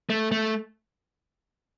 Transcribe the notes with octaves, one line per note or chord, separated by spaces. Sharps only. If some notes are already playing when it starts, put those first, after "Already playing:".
A3
A3